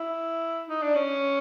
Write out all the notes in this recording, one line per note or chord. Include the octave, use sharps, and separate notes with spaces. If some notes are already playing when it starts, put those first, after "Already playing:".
Already playing: E4
D#4
D4
C#4